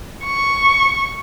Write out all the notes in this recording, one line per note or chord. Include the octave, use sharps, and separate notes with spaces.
C#6